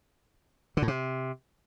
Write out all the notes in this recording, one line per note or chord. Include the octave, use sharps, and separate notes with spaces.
D3
A2
C3